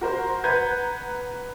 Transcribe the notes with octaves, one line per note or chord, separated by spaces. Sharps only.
F#4 A#4 C5
B4 F#5 A#5 G6 G#6